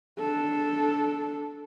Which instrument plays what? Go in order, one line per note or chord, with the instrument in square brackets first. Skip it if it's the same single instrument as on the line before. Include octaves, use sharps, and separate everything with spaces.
[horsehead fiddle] D4 A4